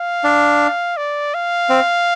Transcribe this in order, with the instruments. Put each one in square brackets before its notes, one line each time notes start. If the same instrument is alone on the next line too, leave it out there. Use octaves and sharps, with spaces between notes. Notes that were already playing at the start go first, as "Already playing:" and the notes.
Already playing: [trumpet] F5
[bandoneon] D4
[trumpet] D5
F5
[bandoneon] C4